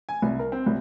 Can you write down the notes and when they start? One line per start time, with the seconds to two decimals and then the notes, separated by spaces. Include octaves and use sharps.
0.09 G#5
0.22 C2
0.39 A#4
0.52 C4
0.66 C2